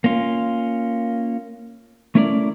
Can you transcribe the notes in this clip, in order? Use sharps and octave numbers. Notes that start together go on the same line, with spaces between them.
A#3 C#4 F4
A3 C#4 E4 A#4 C#5 D5